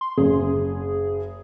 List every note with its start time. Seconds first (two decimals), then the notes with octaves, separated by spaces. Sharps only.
0.01 C6
0.18 F#1 G#4